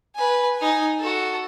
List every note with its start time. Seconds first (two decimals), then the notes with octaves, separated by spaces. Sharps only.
0.15 B4 G#5
0.57 D#4 G#5
0.99 F#4 A4